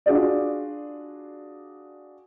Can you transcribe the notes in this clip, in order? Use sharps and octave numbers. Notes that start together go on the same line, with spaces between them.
D4 F4 F#4 G#4 D5